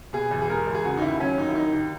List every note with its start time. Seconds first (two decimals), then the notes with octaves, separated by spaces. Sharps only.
0.13 B2 G#4
0.31 E2
0.41 G#4
0.49 G#3 A#4
0.67 E2
0.74 G#4
0.84 C#3 F#4
0.97 D#4
1.02 D#2 E4
1.20 F#3 C#4
1.38 D#2 D#4
1.48 E4
1.55 D#3 D#4
1.73 D#2